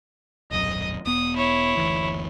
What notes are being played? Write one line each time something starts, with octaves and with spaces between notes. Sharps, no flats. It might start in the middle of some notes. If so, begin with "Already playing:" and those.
D#1 B1 F#2 D#5 D#6
E1 B3 D#6
E4 C#5
F#1 D2 E3